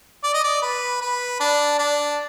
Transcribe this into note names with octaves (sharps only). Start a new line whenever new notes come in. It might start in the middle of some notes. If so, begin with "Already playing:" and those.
D5
D#5
D5
B4
B4
D4
D4